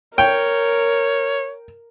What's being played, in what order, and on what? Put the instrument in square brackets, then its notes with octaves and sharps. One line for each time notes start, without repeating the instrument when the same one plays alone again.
[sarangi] A#4 [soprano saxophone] C#5 [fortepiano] G5